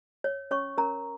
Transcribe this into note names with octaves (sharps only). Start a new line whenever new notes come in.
C#5
C#4 C#5 C#6
C#4 A#4 A#5